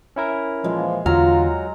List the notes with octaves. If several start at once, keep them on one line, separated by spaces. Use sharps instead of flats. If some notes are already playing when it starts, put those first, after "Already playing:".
C#4 E4 A#4
A#2 E3 F3 G#3
E2 D3 F#3 F4 A#5 F6